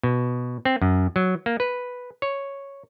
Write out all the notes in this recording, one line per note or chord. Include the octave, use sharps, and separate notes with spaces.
B2
C4
F#2
F#3
A#3
B4
C#5